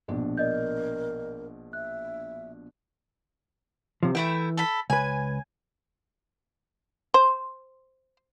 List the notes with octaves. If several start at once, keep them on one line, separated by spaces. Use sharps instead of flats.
A#1 B2 D4
A#4 D5 D#5 G6
E5 F#6
C3 F3
E3 A3 E4 G5
A4 B5
C#2 B4 G#5
C5